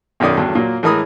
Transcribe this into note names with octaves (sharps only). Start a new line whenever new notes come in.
B1 F#2 D#3 D5 D#6
E2 G2 D3 F#3
A#2 F#3 A#3
A2 E3 G#3 A#4 B5 D#6